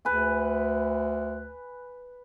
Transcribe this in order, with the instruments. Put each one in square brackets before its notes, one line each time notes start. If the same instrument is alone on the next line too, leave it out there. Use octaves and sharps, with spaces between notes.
[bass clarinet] D2 [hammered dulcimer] B4 G#5